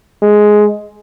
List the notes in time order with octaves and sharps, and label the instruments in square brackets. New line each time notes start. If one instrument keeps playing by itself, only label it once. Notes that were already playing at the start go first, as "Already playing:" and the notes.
[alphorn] G#3